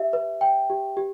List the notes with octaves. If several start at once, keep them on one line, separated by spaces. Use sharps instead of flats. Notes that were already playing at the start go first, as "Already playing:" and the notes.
Already playing: G4 E5
B4
G5
G4
G4